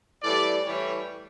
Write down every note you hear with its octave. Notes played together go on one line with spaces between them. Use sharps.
A2 E3 G3 D5
A2 E3 G3 C#5